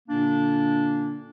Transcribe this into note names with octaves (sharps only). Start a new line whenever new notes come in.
A#2 D3 A#3 D4